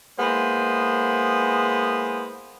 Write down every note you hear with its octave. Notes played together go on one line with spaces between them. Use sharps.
G#3 A#3 B3 E4 C5